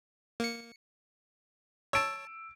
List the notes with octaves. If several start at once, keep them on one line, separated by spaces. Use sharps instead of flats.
A#3 C#7
C#5 A5 E6 D7